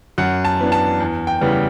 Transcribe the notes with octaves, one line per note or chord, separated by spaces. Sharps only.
F#2 F#5
A5
E3 B3 D4
A5
E2
G5
C#3 E3 G3 B3